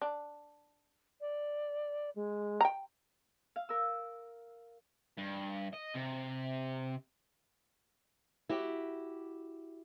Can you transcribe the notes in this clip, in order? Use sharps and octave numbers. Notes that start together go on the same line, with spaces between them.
D4
D5
G#3
G5 A#5
F5
A#4 E6
G2
D#5
C3
E4 F#4 G4